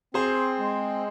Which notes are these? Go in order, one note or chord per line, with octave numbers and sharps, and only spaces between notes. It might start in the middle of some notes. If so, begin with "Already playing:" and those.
C4 G#4 C5
G#3